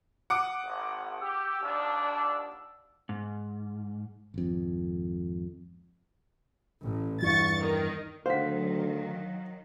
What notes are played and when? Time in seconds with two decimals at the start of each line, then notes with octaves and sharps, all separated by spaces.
0.30 F#5 D6 D#6
0.64 G#1
1.22 G4 E6
1.62 A#1 D#2 D4
3.09 G#2
4.34 G#1 F2
6.83 A1
7.22 E2 G2 E3 C#6 A6
7.60 D#3
8.26 D2 D#3 F#3 C5 F5 F#5 B6